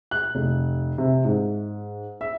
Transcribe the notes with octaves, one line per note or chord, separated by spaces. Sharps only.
F#6
F1
C3
G#2
E5